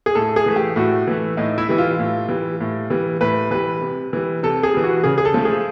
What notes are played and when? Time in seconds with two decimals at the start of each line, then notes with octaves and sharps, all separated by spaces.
0.06 G#4
0.15 A2 A4
0.36 G#4
0.46 E3 A3
0.56 G4
0.76 A2 F#4
1.07 E3 A3
1.37 A2 D#4
1.58 E4
1.69 E3 G3
1.78 F4
1.99 A2
2.29 E3 G3
2.60 A2
2.90 E3 G3
3.21 A2 B4
3.51 E3 G3 B4
3.81 C3
4.13 E3 G3
4.43 C3 A4
4.63 G#4
4.74 E3 G3
4.84 F#4
5.04 C#3 G#4
5.18 G#4
5.25 A4
5.34 F3 A3
5.45 G#4